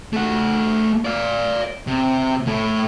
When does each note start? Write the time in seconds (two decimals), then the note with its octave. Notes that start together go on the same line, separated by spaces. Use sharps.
0.13 A3 F#5
1.05 D5 F5
1.87 C3
2.47 A2